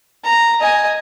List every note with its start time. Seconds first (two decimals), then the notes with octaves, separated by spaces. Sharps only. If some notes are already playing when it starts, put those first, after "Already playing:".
0.24 A#5
0.61 D#5 G#5